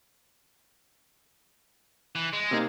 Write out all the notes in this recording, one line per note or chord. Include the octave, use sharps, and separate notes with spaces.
E3
G#3
C3 A#3 D#4